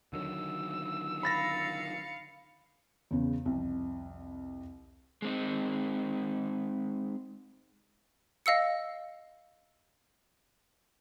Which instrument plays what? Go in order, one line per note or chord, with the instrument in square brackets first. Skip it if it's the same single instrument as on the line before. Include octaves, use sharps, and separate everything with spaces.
[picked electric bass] D3 D#3 F#3 [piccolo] E6
[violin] F5 C#7 [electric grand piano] B5 A6 A#6
[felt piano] E2 C#3
C2 F2
[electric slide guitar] G#3 C4 D#4
[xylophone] D#5 F5 E6 C#7